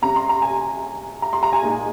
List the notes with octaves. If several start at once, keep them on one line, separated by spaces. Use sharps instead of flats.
C3 G3 C#4 A#5
C6
A#5
G#5
A#5
C6
A#5
G#5
A#2 G#3 D#4